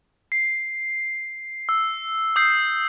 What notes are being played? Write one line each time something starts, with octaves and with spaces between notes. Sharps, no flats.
C7
E6
D#6 G6 C7